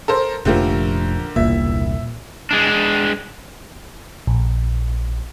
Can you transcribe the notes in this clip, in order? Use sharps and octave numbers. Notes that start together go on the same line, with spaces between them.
A4 A#4 C5
F1 A#2 D3 F3 A3 G4 A#4
E1 C2 A#2 E5
G#3 D4
A#1